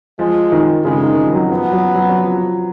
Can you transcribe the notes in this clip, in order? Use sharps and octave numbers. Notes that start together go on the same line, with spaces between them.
F3 G#3
D#3
C#3 G#3
D#3
D#3
F3
F#3
F3 B3
F#3
F#3
F#3
F3